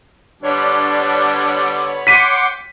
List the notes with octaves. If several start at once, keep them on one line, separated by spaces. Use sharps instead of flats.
D3 G3 B3 D4 C#5 B5
F#5 G5 C6 D6 B6 D#7